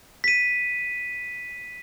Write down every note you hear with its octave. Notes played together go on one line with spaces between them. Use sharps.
B6 D#7